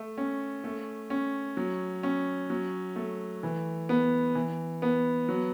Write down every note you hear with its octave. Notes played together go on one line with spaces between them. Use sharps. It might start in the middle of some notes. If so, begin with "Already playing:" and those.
Already playing: A3
C#4
A3
C#4
F#3
C#4
F#3
A3
E3
B3
E3
B3
F#3